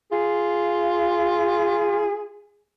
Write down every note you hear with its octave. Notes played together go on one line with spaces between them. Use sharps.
F4 G#4